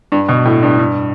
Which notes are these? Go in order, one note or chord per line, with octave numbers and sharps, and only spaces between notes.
G2
B2
A2
G2
G2